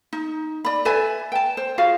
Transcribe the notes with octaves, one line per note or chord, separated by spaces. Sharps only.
D#4
D5 B5
A4 B4 E5 G#5
G5 A5
C5
F4 F#4 G#4 F5